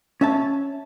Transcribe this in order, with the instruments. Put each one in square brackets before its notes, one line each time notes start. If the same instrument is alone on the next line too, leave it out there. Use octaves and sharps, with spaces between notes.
[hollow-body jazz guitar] C#4 E5 A5